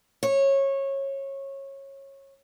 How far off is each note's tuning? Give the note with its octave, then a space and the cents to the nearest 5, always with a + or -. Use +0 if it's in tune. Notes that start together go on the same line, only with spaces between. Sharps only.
C#5 -20